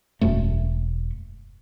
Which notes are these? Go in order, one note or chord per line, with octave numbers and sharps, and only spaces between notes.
E1 F#2 A3